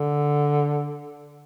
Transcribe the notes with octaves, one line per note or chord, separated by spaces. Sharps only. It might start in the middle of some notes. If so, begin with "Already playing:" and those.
Already playing: D3